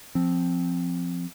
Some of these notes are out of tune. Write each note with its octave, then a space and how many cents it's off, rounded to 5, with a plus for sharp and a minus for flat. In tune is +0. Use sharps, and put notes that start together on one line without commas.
F3 +0 C4 +0